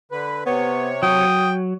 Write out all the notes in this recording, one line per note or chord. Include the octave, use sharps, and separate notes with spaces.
D3 B4
C3 B3 C#5
F#3 G5 D#6